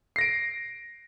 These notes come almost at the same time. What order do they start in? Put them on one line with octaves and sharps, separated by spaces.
C7 A#6 D7